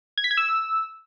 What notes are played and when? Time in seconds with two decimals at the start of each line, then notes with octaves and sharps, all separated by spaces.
0.18 G#6
0.24 B6
0.31 G#6
0.37 E6